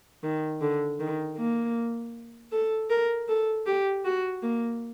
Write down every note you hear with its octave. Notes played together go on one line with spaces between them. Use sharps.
D#3
D3
D#3
A#3
A4
A#4
A4
G4
F#4
A#3